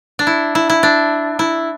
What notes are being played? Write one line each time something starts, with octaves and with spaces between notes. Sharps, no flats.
D4
E4
E4
E4
D4
E4